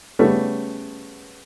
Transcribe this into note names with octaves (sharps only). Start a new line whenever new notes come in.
C#3 G3 A3 B3 C#4